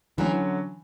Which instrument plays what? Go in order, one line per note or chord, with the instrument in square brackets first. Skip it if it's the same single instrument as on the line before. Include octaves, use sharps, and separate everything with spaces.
[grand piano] D3 F#3 C#4 [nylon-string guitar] E3